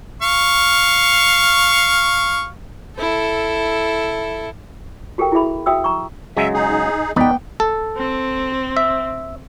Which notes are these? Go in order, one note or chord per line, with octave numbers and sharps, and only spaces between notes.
F5 C#6
E4 A4
F#4 G4 A4 A#4 G5
E4 F#4 G#4 E5 B5
F#4 E5 G5 D#6 E6
A#5 C#6
C#3 F#3 G#3 E5
D#4 G#4
B3 D#4 B4 D5 G5
A4
C4
E5